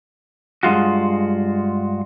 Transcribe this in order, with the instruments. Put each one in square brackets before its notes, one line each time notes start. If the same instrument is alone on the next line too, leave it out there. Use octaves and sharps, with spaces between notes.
[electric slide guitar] G2 G#3 F4 F#4